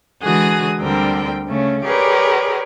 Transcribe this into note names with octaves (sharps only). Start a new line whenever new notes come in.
D3 E3 G#3 F#4 G#4 D#6
D2 D3 G3 C4 A#4 G5
C#3 A3 C#4
G4 G#4 A#4 B4 C#5 D5